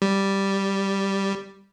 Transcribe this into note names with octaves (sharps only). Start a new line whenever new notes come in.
G3